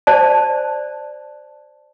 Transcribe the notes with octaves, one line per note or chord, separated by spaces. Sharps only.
C5 D5 A5